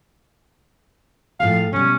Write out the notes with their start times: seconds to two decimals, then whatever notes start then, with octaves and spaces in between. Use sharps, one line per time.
1.40 A2 F3 G#4 F5
1.73 B2 G3 C#4